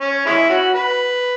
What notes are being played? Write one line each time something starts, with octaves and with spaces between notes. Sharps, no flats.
C#4
G#3 C#4 E4
C#4 F#4
B4